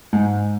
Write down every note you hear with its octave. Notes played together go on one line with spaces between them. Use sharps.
G#2